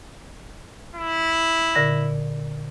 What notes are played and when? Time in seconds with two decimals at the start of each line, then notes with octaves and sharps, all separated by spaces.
0.95 E4
1.75 A#2 D3 A#6